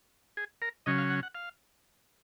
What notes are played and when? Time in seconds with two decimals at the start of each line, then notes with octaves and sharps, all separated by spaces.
0.37 G#4
0.62 A#4
0.86 C#3 F#3 C#4 D#5
0.98 F5
1.10 F#5
1.23 F#5
1.35 F5